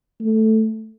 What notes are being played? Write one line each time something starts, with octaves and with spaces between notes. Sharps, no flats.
A3